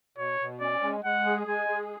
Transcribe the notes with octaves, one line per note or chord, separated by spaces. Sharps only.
B2 C#5
B2
C#4 D5
G#3
G#3 F#5
G#4
G#3 G#5
G#4